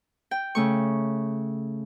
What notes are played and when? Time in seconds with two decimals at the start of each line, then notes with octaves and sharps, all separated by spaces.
0.31 G5
0.55 C#3 A3 C#6